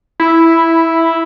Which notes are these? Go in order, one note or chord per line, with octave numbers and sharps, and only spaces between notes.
E4